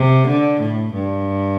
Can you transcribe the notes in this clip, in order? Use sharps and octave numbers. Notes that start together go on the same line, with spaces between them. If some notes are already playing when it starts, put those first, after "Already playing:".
Already playing: C3
D3
A2
G2